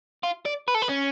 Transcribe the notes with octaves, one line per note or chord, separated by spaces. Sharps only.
F4
D5
B4
A4
B4
C#4